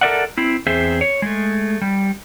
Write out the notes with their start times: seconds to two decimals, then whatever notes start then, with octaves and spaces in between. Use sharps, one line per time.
0.01 A4 A#4 C5 D5 E5 F#5
0.38 C4 E4
0.67 E2 C4 G#4 C5 E5
1.01 C#5
1.22 G#3 A3
1.81 G3